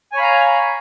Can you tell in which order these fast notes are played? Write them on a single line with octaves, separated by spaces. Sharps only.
G#5 C#5 B5 F5 A#5